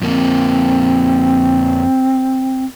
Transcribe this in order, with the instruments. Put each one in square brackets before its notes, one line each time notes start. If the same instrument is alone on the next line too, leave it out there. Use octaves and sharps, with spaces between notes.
[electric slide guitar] F2 A#3 [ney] C4